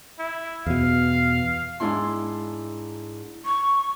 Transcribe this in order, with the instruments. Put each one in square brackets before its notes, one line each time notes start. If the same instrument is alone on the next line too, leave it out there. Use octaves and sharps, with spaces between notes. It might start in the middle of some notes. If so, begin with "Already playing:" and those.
[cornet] E4
[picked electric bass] E2 B2 [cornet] F5
[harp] G#2 D4 E4 C6
[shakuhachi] C#6